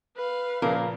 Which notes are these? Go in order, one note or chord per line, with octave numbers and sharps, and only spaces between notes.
B4 F5
A#2 C#3 F3 A#3